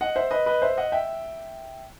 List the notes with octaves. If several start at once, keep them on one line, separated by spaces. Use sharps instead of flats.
D#5 F#5
C5 E5
B4 D#5
B4 D#5
C5 E5
D#5 F#5
E5 G5